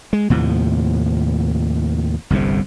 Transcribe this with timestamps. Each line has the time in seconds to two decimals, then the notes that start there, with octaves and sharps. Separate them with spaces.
0.13 G#3
0.30 D#2 A2 C3 F3
2.30 G1 C2 F2 C3